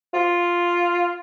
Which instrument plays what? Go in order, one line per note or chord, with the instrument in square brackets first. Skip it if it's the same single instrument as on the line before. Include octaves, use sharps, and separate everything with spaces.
[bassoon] F4